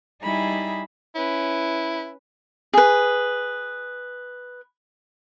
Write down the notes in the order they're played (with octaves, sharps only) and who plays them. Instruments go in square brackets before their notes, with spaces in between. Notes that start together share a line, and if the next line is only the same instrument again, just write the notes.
[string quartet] G3 D#4 E4 G#4 B5
[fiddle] C#4 B4 [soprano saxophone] E4
[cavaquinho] G#4 B4